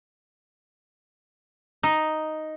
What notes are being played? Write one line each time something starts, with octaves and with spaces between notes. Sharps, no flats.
D#4